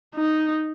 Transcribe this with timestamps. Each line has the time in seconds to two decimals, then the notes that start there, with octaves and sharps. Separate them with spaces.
0.15 D#4